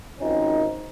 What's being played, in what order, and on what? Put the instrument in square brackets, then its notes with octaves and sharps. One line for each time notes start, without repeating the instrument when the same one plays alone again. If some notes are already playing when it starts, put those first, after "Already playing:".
[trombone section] G#1 D#3 F3 C4 C#4 D#4